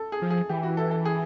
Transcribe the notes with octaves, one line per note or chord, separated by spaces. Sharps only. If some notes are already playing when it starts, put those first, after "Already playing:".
Already playing: A4
G#4
F3
G#4
E3 G4
F#4
A4
A4
G#4